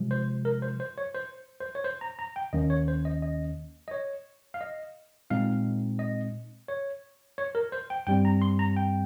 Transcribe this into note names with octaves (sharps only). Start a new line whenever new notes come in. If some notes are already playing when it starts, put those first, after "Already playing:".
Already playing: C3 F3 G#3
C5
A#4
C5
C5
C#5
C5
C5
C#5
C5
A#5
A#5
G5
D#2 D#3 A#3 C#4 D#5
C#5
C5
D#5
D#5
D#5
C#5
F5
D#5
A#2 G#3 C4 D#4 F5
D#5
C#5
C#5
A#4
C5
G5
G2 G3 C4 G5
A#5
C6
A#5
G5